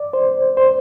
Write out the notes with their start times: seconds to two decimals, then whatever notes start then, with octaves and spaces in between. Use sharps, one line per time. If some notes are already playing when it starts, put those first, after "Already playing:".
Already playing: D5
0.13 C5
0.57 C5